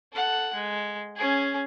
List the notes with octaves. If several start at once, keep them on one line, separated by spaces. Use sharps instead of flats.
A4 F#5
G#3
C#4 G#4